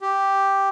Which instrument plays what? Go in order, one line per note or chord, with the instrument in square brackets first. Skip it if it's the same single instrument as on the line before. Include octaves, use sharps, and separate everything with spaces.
[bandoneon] G4